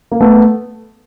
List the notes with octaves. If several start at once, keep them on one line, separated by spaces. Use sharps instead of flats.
A#3
A3 B3